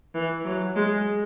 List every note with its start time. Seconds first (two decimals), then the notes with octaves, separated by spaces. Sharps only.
0.15 E3
0.45 F#3
0.76 G#3